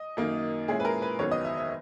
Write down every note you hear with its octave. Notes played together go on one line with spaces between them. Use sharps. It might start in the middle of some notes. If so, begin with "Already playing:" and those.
Already playing: D#5
F#2 D#3 A#3 D#4
A#2 G#3 C#4 E4 G#4
B4
A#4
B4
F#1 E2 D#3 F#3 B3 C#5
D#5
E5
E5